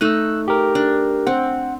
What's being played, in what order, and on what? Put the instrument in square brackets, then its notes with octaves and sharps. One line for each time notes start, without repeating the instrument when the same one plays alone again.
[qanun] A3 D#4 D#5 [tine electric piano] E6 F#6
[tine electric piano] G4 A#4
[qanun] D4
[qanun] C4 [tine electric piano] F#5